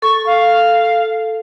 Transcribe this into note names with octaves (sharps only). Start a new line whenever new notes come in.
A4 C#6
F5